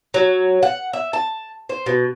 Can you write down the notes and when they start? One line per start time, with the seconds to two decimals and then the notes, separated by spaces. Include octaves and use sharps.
0.14 F#3
0.63 F#5
0.93 E5
1.13 A5
1.69 C5
1.86 B2